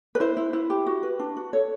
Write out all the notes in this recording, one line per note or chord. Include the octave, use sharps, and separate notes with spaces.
B4
E4 C5
E4
E4
G4
F#4
B4
D4
F#4
A4 C#5